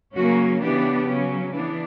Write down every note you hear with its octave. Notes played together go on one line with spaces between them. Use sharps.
C#3 F#3 A#3 C#4 F#4
C#3 E3 B3 D4 G4
C#3 F#3 C#4
E3 B3 D4